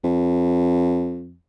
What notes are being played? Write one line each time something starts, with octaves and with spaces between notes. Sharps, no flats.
F2